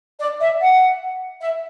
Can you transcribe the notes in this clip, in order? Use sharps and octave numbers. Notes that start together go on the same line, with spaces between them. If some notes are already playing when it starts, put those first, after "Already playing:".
D5
E5
F#5
E5